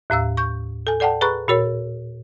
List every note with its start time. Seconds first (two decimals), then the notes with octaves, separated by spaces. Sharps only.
0.10 D#2 A2 F5 E6
0.37 C#6 G6
0.87 A4 G#5
1.00 A4 D5 F#5 G5 A5
1.21 G#4 B4 A#5 B5 C#6 F#6
1.48 A#2 F#4 A#4 C#5